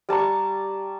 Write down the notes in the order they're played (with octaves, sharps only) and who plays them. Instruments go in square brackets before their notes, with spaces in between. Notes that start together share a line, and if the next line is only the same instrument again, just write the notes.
[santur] G3 A5 A#5 C#6